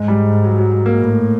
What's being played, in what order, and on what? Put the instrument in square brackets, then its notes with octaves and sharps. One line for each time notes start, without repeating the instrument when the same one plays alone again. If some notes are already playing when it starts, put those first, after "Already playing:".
Already playing: [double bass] G#2 [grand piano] G#3
[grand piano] G3
F#3
F#3
A#3
[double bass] A2